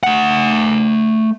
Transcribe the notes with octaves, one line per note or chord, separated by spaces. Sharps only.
A3 F#5